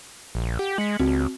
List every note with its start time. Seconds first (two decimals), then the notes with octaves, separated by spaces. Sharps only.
0.35 A#1
0.59 G4 F#5
0.78 G#3 B6 C#7 F#7
0.99 C#2 C4 F#4